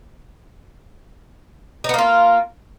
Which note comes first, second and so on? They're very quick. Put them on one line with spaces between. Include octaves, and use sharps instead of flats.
D#4 B3 A#3 F4